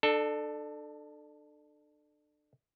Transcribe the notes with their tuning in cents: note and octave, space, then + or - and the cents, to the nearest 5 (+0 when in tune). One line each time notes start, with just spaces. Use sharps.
D4 +30 A4 +0